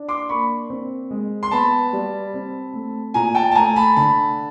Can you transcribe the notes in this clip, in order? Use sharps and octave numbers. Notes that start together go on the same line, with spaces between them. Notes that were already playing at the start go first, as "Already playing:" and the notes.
Already playing: D4
C6 D6
A#3 B5 C#6
C4
G#3
C6
B3 A5 B5
G3
C4
A3
A#2 G#5 A#5
G5 A5
A5
A3 G#5 A#5
A5 B5
D3 A5 B5